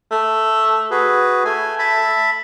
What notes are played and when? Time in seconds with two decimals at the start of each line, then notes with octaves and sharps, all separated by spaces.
0.11 A3
0.91 F#4 G#4 B4
1.45 A3 G#5
1.79 E5 A5 B5